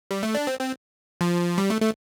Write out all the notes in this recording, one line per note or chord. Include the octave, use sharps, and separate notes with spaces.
G3
A3
D4
C4
C4
F3
G3
A3
A3